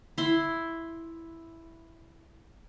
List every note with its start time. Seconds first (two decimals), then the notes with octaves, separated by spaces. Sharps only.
0.18 E4 C6